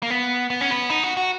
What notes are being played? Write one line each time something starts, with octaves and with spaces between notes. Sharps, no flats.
A#3
B3
B3
C#4
B3
D#4
F#4
F#4